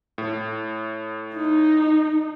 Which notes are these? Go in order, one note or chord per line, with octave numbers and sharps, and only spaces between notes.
A2
D#4